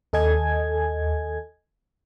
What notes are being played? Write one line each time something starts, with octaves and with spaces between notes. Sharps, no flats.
D#2 A4 D#5 G#5 G#6